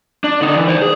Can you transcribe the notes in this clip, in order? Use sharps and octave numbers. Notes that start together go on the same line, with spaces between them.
D4
D3 D#4
E3
C5 D5
G#4